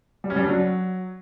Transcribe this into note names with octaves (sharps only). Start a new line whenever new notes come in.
G3
C#4
G3
D4
F#3